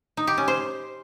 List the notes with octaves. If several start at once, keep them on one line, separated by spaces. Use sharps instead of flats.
D#4
G4
C#4
C5